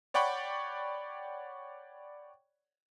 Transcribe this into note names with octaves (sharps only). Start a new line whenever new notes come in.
C#5 D5 F#5 G5 B5 C#6